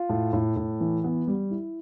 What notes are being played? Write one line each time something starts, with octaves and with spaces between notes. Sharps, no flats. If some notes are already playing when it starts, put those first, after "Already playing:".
Already playing: F4
A2
A2
A2
E3
B3
G3
E4